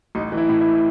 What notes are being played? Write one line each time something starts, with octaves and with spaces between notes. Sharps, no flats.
A1 D#4
E3
E4
A2
E4